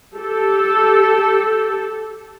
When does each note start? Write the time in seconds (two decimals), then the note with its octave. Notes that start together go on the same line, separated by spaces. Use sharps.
0.15 G4 A4